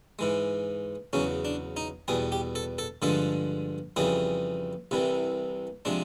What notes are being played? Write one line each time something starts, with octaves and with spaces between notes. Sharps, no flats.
G#2 E3 G#3
E2 C#3 F#3 C#4
D4
D#4
E2 B2 G3 G#4
G4
A4
A4
G2 D3 F3 G#3 A4
F2 C#3 E3 G3 G#4
C2 C3 E3 G3
C3 F3 G#3 D4